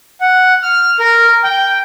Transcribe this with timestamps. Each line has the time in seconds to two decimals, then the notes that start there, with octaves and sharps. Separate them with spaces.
0.21 F#5
0.63 F6
1.00 A#4
1.44 G5